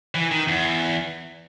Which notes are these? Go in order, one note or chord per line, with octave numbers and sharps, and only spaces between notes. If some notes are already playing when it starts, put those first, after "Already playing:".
E3
D#3
E2